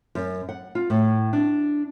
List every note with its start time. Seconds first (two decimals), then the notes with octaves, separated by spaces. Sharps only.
0.15 F#2
0.49 F#5
0.75 F4
0.90 A2
1.33 D4